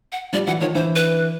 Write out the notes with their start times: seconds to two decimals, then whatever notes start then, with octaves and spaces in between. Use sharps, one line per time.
0.12 F#5
0.33 F3 G3 D5
0.47 E3 F#3 F#5
0.61 D#3 F3 C#5
0.75 D3 E3 C5
0.96 B4